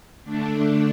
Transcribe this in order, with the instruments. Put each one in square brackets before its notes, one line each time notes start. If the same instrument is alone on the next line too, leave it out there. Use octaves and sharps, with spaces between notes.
[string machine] D3 A3 D4